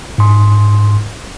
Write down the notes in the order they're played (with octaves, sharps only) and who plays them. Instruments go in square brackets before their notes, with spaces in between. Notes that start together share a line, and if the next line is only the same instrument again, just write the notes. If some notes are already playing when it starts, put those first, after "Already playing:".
[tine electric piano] G#2 C6